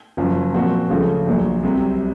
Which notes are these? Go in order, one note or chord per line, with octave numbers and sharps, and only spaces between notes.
F#1 F#2 F3
A#2 F3 C4 F#4 A#4
C#2 C#3 F3 A3
A#1 A#2 F#3
C2 C3 F#3 C4